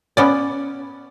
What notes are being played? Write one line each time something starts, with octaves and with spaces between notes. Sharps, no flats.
B3 C#4 D5